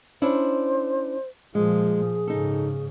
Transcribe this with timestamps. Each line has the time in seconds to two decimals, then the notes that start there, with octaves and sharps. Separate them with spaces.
0.22 C#4 D4 E4 C5
1.55 A#2 F3 G#3 G#4
2.27 G#2 C#3 D#4 A4